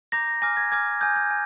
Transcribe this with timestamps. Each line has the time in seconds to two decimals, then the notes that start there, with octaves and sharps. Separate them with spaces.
0.12 A#5 D6 G6 A#6
0.42 G#5 D6 F6 A#6
0.57 G#6
0.72 G#5 D6 F6 G#6
1.01 G#5 D#6 G6
1.16 G6
1.31 G#5